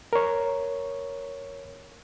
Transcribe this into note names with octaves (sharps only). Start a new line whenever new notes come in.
A#4 C#5